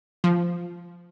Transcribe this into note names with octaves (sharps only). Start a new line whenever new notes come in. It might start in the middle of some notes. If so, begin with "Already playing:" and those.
F3